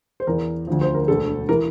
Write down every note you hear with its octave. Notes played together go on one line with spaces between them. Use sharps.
C5
E2 E3 A#4
D2 D3 F3
C5
A#4
E1 D2 D3 A4
E3 A#4